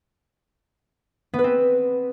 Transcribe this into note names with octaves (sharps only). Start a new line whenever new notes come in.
B3
B4
C4